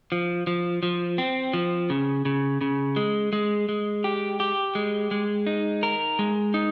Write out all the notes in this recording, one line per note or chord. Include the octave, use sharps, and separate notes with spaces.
F3
F3
F3
C4
F3
C#3
C#3
C#3
G#3
G#3
G#3
G4
G4
G#3
G#3
D#4
A#4
G#3
D#4